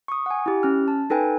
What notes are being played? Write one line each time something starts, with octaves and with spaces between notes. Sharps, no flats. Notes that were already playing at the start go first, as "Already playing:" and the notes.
C#6 D#6
F#5 G#5
E4 G4
C#4 F6
A5
D#4 A4 B4 G5 G#5